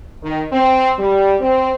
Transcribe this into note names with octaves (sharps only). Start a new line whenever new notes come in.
D#3
C4
G3
C4